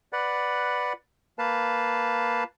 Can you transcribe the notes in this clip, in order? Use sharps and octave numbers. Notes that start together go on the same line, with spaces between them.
B4 D5 F#5
A#3 B4 F5 A5